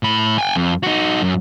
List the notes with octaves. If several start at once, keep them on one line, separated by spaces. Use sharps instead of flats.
A2 B5
G5 G#5
F2
D#4 F#4
F#2